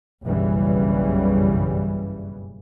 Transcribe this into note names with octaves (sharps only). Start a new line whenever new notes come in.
F#1 B1 G2 C#3 E3 G3